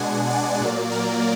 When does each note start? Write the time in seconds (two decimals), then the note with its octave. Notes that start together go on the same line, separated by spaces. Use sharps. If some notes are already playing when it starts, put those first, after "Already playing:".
Already playing: B2 G#3 D4 F#5 G#5
0.30 D5
0.61 A#2 F#3 A#3
0.91 A#4